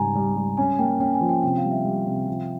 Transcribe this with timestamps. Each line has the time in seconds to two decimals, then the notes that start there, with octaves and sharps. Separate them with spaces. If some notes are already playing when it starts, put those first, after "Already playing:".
Already playing: G#2 C#3 G3 G#5 A#5
0.15 G3
0.36 G3
0.57 C#4 G#5
0.79 A#3 G5
1.00 C#4 G5
1.14 G#5
1.21 F3
1.29 G5
1.43 C3 G5
1.57 F5
1.64 G3
1.71 E5
1.85 G3
2.06 C3
2.28 F3